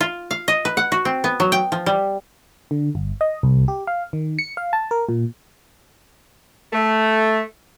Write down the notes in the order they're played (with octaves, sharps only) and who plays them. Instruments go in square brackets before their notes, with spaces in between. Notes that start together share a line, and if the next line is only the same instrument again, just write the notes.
[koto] F4
F5
D#5
B4
F#5
F#4
C4
B3
F#3
G5
F3
G3
[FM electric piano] D3
G1
D#5
C2
G4
F5
D#3
C#7
F5
A5
A#4
A#2
[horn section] A3